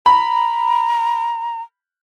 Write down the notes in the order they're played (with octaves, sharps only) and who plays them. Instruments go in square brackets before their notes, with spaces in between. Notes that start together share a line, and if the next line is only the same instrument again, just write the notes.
[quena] A#5 [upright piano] B5